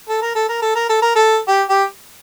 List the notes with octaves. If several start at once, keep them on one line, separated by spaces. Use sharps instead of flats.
A4
A#4
A4
A#4
A4
A#4
A4
A#4
A4
G4
G4